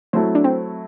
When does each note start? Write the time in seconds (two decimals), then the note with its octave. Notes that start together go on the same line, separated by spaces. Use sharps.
0.13 F#3 A3 C4 E4 A4
0.35 D4
0.44 C4